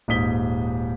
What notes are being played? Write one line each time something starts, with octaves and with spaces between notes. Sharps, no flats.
D#1 G#2 D#6 B6 G7